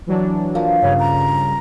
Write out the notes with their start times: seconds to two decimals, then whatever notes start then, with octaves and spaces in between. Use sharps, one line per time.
0.07 E3 F#3 D4
0.55 F3 A#3
0.82 G2 C#3 C#5
0.99 A#5